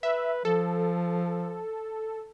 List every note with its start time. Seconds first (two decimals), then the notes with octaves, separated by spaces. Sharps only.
0.03 B4 E5
0.45 F3 A4